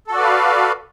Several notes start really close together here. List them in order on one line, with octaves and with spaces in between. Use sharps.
A4 F#4 D5 B4 F5